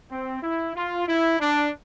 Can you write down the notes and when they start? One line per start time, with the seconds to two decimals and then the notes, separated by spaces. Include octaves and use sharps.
0.11 C4
0.43 E4
0.76 F4
1.08 E4
1.40 D4